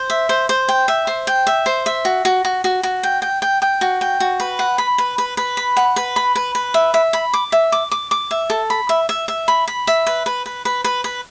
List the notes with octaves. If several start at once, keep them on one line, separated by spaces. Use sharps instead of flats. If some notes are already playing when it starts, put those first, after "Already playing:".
Already playing: C5
E5
C5
C5
G5
E5
C5
G5
E5
C5
E5
F#4
F#4
F#4
F#4
F#4
G5
G5
G5
G5
F#4
G5
F#4
B4
F#5
B5
B4
B4
B4
B5
F#5
B4
B5
B4
B4
E5
E5
B5
D6
E5
D6
D6
D6
E5
A4
B5
E5
E5
E5
B5
B5
E5
B4
B4
B4
B4
B4
B4